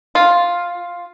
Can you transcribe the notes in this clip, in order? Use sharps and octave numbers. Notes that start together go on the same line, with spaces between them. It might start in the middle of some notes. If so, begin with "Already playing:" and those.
F4